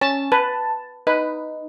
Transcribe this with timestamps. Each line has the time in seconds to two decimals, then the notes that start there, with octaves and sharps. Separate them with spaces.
0.01 C#4 A5
0.32 B4 A5
1.07 D#4 B4